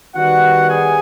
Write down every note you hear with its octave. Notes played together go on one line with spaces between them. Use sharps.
D#3 G3 B3 F#4 F#5
G#4 G#5